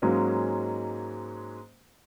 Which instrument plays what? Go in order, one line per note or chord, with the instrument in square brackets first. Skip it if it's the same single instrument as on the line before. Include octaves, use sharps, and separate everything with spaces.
[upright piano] G#2 F#3 G#3 A#3 C#4